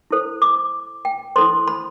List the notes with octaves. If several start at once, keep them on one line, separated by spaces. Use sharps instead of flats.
E4 A4 C5
D6
G5
E4 A4 C5 C6
B5